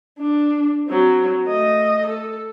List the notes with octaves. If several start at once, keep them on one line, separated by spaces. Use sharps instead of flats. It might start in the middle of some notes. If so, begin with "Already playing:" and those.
D4
F#3 C4
A3 D#5
A4